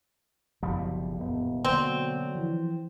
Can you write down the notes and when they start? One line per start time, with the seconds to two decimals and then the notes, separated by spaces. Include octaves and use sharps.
0.63 F#1 C2 F#2 B2 F3 G3
1.20 D#1 B3
1.65 B2 D3 F#3 A#3 C4
2.35 E3 F3